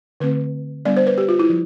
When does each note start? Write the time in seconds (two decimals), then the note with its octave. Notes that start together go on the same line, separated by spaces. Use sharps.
0.20 D3 A3 C4 B4
0.85 G3 B3 D4 D5
0.97 C5
1.07 B4
1.18 G4
1.28 F4
1.39 E4
1.50 F3